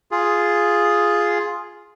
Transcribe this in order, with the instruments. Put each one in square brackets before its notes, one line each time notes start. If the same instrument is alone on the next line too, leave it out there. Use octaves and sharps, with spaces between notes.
[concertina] F4 G#4